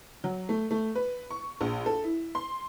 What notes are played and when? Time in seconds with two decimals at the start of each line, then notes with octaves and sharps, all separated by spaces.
0.24 F#3
0.49 A3
0.71 A3
0.95 B4
1.30 C#6
1.61 A#1
1.86 A4
2.04 E4
2.35 C6